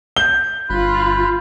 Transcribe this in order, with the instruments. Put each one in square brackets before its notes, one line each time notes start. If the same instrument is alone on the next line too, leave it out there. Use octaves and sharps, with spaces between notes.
[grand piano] G6 G7
[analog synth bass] G1 [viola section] F4 [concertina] B5 F#6